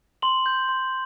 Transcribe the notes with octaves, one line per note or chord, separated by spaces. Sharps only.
C6 F#7
G6
C6